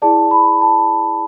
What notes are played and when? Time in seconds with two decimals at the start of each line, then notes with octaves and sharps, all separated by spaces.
0.02 E4 G#4 D5 A5
0.31 B5
0.62 A5